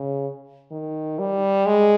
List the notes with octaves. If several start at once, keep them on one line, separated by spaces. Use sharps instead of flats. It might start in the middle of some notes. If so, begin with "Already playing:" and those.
Already playing: C#3
D#3
G3
G#3